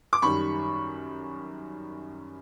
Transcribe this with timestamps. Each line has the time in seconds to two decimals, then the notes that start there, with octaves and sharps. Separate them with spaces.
0.13 D6
0.22 F#2 D#3 G3 B5 C#6